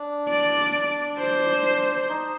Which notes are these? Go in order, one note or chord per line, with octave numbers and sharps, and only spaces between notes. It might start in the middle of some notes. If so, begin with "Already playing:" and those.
Already playing: D4
D5
D4
C5
D#4